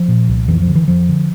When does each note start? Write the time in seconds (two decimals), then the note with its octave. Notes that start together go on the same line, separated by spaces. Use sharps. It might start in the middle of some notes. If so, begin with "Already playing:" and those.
Already playing: F3
0.08 A#2
0.28 C2
0.48 F2 E3
0.62 F3
0.68 D3
0.75 E3
0.88 F2 F3
1.09 D3